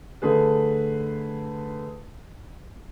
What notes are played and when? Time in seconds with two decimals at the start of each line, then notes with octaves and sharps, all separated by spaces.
0.22 D3 A3 G#4 B4